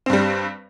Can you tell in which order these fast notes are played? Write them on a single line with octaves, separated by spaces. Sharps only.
C4 G2 G3